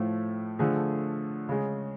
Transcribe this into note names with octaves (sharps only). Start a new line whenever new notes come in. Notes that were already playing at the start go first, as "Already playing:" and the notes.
Already playing: A2 F3 A3
D3 F3 A3 G#4
C#3 G#3